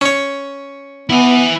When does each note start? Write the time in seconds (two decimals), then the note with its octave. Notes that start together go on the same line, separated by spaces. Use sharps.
0.01 C#4 C#5
1.09 B3 E4 G#5